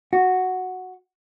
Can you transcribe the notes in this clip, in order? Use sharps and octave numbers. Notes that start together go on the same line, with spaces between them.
F#4